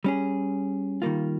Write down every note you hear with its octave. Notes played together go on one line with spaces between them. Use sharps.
G3 C#4 G#4
D#3 G3 A#3 F4